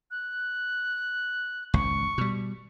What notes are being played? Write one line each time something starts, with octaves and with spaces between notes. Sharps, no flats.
F#6
G#1 C#2 C#6
B2 G3